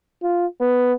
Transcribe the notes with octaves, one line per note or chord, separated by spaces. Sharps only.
F4
B3